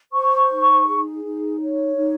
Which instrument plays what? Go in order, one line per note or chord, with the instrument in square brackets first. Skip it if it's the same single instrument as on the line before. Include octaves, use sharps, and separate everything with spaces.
[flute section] C5 C#6
D#4
G#4
D#4
C#5
D#4